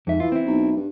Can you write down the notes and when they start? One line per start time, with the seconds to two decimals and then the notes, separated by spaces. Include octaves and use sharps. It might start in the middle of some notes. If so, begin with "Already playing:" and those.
0.07 F2 G#2 E5
0.20 E3 F4
0.32 C4 E4
0.46 B1
0.76 G2